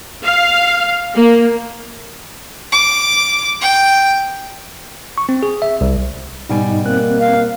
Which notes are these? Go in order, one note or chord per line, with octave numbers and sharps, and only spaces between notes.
F5
A#3
D6
G5
C#6
C4
G#4
E5
C2
G#2 B2 G3 D#4 G#5
A#3 C4 F#6
F5